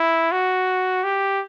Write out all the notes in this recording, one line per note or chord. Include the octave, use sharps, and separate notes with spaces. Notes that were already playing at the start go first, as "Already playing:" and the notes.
Already playing: E4
F#4
G4